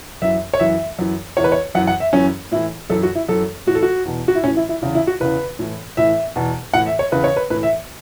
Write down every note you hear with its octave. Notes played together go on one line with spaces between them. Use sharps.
F#2 E3 E5
C#5
F#2 E3 E5
F#2 E3
E2 E3 C#5
B4
C#5
F#2 E3 F#5
F#5
E5
F#2 E3 C#4
A2 E3 E4
F#2 E3 A4
F#4
E4
F#2 E3 A4
A2 E3 F#4
A4
F#4
E2 B2
F#4
E4
A2 E3 C#4
E4
E4
E2 C#3 E3
E4
F#4
E2 C#3 E3 B4
A2 E3
A2 E3 E5
E2 B2
A2 E3 F#5
E5
C#5
E2 C#3 E3 B4
C#5
B4
A2 E3 B4
E5